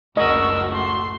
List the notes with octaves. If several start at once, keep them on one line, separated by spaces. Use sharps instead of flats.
F#1 C#2 A2 F#4 A#4 D#5 E6
A3 C6